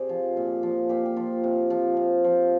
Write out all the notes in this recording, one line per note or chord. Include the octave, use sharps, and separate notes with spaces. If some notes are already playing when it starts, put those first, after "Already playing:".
Already playing: C3 G#4 C5 D5
F3
A#2
F3
A#2 G4
G4
F3 F4
C3
F3
C3
F3